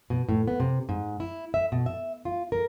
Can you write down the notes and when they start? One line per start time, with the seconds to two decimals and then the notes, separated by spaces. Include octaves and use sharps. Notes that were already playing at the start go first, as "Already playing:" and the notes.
0.10 B2
0.29 A2
0.48 B3
0.60 C3
0.89 G#2
1.20 E4
1.54 E5
1.72 B2
1.86 E5
2.25 F4
2.52 A#4